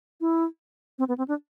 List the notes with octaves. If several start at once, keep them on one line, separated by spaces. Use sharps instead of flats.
E4
C4
B3
C4
D4